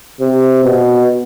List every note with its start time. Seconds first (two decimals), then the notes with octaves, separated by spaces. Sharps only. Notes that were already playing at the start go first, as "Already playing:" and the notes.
0.21 C3
0.64 B2